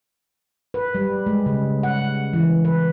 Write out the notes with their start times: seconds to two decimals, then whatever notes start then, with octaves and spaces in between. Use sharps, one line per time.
0.74 B4
0.95 G3
1.26 G#3
1.46 C#3
1.83 F#5
2.33 E3
2.65 B4